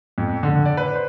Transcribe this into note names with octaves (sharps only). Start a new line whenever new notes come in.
F2
D3
D5
B4
C5